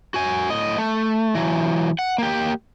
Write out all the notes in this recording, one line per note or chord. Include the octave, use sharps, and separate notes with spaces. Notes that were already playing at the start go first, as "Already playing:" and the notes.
F#4 G#5
A2 D#5
A3
E3 F#3
F#5
A#3 G4